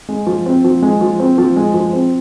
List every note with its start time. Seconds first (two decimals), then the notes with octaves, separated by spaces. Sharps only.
0.09 G#3
0.27 F3
0.46 C4
0.64 F3
0.82 G#3
1.01 F3
1.20 C4
1.38 F3
1.56 G#3
1.74 F3
1.93 C4